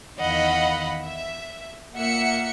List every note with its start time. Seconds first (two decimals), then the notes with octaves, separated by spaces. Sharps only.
0.18 E2 D#3 D#5 F5 F#5 B5
1.04 E5
1.95 A#2 A#3 E5 F#5 C#7